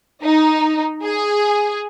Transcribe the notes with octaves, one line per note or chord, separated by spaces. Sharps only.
D#4
G#4